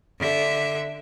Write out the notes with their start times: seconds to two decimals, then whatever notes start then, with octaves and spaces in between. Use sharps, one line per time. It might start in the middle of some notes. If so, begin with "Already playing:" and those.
0.19 D3 E5